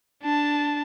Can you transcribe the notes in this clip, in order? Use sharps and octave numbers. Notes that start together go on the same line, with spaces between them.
D4 A5